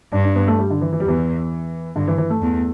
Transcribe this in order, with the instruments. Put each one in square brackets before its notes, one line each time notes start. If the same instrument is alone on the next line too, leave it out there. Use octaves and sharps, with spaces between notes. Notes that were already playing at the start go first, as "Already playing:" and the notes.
[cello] G2 [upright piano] D4
[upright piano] D4
B3
A3
G3
D3
E3
E3
G3
[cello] E2 [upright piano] E3
[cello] G2 [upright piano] D3
[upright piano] E3
E3
A3
[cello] E2